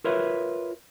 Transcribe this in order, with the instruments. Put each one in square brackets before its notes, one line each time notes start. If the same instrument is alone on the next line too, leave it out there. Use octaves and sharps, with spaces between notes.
[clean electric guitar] F4 A#4 B4 C#5 E5